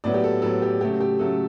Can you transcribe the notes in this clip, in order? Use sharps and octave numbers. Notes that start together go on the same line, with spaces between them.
A2 F#3 B3 D5
G4
A4
A2 F#3 B3 A4
G4
C#3 F#3 A3 G4
G4
C#3 F#3 A3 A4